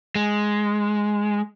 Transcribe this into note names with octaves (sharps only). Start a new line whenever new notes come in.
G#3